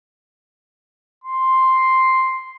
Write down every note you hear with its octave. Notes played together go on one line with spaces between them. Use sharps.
C6